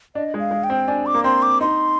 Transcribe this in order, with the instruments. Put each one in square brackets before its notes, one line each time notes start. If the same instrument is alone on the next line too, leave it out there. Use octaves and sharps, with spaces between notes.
[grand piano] D4 [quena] D#5
[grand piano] G#3
[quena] F5
[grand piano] G#3
[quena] G5
[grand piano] C4
[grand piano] D4 [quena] G#5
[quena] D6
[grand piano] A#3
[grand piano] C4 [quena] C6
[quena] D6
[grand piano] D#4 [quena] C6